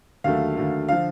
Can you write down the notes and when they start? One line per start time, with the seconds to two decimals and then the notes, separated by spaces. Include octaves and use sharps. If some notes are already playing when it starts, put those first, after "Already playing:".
0.24 D#2 D3 F#3 A3 F5
0.57 D#2 D3 F#3 A3
0.89 D3 F3 F5